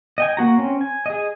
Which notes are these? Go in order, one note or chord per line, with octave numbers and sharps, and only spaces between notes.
D#5 G5 G#5
A#3 F#4 A#5
C4 C#4
G#5
G#4 D#5